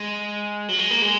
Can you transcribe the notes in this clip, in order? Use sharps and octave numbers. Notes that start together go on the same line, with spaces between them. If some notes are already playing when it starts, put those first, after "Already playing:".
Already playing: G#3
F#3
G#3
A#3
G#3